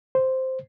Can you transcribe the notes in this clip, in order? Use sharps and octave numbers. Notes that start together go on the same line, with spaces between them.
C5